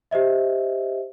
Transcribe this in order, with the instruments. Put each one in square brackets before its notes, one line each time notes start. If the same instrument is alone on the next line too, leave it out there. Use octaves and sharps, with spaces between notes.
[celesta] G4 C5 D#5 E5